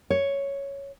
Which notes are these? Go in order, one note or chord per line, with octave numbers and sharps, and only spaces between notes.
C#5